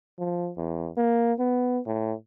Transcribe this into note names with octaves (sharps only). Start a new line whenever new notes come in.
F3
E2
A#3
B3
A2